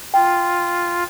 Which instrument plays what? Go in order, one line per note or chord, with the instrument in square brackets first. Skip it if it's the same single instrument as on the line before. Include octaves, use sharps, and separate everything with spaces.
[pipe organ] F4 [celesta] G5